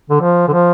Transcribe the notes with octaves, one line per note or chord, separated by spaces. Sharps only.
D3
F3
D3
F3